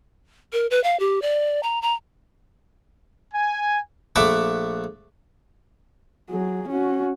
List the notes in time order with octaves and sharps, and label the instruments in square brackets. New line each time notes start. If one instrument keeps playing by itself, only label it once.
[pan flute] A#4
B4
F5
G4
D5
A#5
A#5
[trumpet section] G#5
[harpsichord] A#1 A3 E5 F#5 B5 D6
[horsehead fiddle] F#3 G#4
C#4 F#4